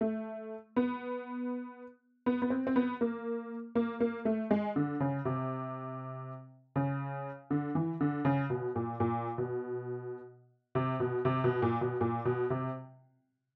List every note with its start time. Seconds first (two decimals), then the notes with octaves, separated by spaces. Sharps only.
0.01 A3
0.76 B3
2.26 B3
2.42 B3
2.50 C4
2.67 C4
2.76 B3
3.01 A#3
3.75 A#3
4.00 A#3
4.25 A3
4.51 G#3
4.76 D3
5.00 C#3
5.25 C3
6.76 C#3
7.51 D3
7.75 E3
8.01 D3
8.25 C#3
8.50 B2
8.76 A#2
9.00 A#2
9.38 B2
10.75 C3
11.00 B2
11.25 C3
11.44 B2
11.62 A#2
11.81 B2
12.01 A#2
12.25 B2
12.50 C3